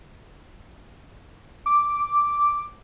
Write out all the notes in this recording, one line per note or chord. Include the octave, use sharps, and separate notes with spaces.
D6